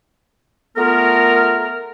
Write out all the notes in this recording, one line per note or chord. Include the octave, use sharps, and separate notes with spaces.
A3 B3 F4 A#4